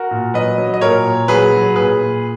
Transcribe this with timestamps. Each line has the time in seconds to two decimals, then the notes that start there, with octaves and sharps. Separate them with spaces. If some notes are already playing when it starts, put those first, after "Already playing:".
Already playing: F#4 A#4
0.11 A#2
0.34 F#3 B4 D#5
0.58 F#3
0.74 D#5
0.81 A#2 A#4 C#5
1.05 A#2
1.28 F#3 G#4 B4
1.53 F#3
1.75 A#2 G#4 B4
1.99 A#2